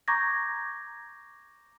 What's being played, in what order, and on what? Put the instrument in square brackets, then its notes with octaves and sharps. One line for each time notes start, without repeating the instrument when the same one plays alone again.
[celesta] A#5 C#6 D6 G6 G#6 A#6